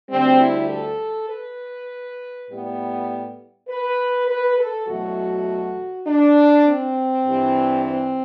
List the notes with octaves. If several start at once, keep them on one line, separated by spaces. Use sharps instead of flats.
D2 D3 G3 C4
E4
A4
B4
A2 G3 B3
B4
B4
A4
E2 B2 F#3 A3 F#4
D4
C4
G2 E3 G3
C4